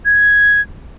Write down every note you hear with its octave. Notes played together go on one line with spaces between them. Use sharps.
G#6